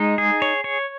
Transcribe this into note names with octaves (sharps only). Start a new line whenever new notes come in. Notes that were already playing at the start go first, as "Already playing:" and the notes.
Already playing: G#3 D#4
G#4
C#5
C#5